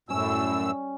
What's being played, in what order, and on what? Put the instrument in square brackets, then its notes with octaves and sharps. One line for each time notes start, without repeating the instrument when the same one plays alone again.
[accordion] F#2 A2 E6 [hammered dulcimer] G3 C#4